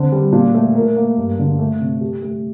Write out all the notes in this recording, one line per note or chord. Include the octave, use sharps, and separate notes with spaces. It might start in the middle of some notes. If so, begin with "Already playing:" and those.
Already playing: D3 C4
G3
A#2
A3
A#4
A#3
G2
D3
A3
C3
G4
A3